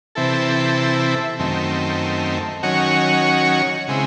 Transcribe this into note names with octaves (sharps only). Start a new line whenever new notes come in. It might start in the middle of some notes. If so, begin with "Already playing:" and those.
C3 E3 C4 E4 A4
F#2 D#3 A3 C4
D#3 F#3 C#4 F#4 C#5
C#3 G#3 C4 E4